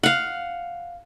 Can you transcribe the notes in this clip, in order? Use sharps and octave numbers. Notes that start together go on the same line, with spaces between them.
F5 F#5